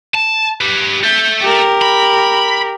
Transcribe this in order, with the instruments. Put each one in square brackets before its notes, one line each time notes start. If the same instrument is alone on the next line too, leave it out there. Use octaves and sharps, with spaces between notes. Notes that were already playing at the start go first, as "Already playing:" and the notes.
[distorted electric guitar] A5
G4 B4
[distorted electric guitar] A4 E5 [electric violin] G6
[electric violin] G4 A#4
[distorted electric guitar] B5